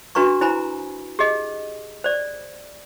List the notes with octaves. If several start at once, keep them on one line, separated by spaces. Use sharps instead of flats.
D4 F#4 B4 A#5 C#6
E4 C5 G#5 A#5 B5
G4 G#4 D#5
C5 D5